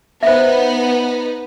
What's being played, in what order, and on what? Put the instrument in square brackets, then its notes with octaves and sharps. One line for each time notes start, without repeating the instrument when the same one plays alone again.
[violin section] B3 D#4 [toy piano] C5 E5